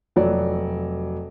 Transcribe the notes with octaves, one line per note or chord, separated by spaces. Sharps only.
F1 F#3 D5